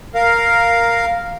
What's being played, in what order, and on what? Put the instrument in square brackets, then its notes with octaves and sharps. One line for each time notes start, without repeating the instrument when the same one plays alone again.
[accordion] A#4 F5